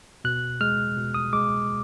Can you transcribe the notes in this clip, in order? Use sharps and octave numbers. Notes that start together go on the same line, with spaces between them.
B2 F#6
G#3 F6
B2
D#6
G#3 D6